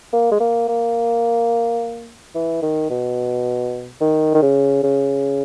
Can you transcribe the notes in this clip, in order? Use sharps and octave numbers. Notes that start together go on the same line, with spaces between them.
A#3
G#3
A#3
A#3
E3
D#3
B2
D#3
D#3
C#3
C#3